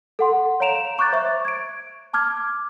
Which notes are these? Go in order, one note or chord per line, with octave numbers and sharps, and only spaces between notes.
A4 F#5 C6
C#5 F5 A#5 D7 E7 F7
A#5 C#6 D6 F#6 G6 A6
C5 E5 C#6
G#6 D7
A5 D6 F6 G#6